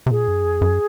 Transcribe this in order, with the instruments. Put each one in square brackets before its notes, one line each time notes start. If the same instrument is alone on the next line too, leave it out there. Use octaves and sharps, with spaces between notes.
[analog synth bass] C3
[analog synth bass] A#2 [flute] G#4
[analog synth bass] F#2
F2
F#2